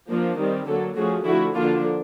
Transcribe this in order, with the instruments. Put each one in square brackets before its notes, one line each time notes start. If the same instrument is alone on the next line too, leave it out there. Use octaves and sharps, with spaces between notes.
[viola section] F3 A#3 D4
D#3 G3 C4
D3 F#3 A#3 G4 A4
F3 A3 C#4 F#4 G#4
D3 F3 A3 E4 F#4
D3 F3 A#3 D4 F4